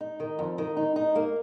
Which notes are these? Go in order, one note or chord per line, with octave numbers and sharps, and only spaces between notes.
D#4
D#3
F2
D#3
D#4
D#4
A#3